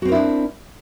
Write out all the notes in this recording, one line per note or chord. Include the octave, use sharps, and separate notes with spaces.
C4 D4 E4 F#4 A#4